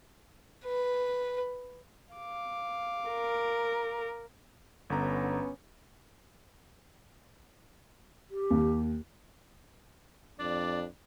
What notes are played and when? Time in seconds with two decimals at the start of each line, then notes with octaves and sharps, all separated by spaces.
0.65 B4
2.13 F5 D6
3.09 A#4
4.90 G1 D3 B3 C#4 A#5
8.31 G4
8.50 D#2
10.39 F2 D4 D5